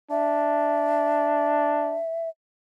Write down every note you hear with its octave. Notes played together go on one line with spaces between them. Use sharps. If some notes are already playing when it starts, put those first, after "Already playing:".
D4 E5